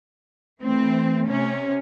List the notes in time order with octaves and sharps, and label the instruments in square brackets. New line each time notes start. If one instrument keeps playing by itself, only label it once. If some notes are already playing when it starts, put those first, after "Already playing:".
[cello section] E3 C4 [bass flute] A3
[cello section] C3 C#4